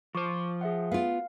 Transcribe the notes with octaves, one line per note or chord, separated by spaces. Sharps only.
F3 C5 C#6 D6
G#4 E5 F#5
B3 F4 F5